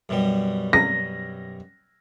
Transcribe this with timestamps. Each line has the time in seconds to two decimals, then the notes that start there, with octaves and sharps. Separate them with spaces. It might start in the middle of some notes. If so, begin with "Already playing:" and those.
0.09 F#2 B2 G3
0.73 A#6